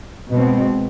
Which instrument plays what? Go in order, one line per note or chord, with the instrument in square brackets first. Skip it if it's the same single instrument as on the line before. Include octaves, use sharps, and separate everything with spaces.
[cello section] B2 G#3 C4